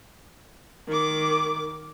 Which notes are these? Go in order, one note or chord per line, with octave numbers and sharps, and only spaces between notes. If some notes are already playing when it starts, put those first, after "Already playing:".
D#3 D6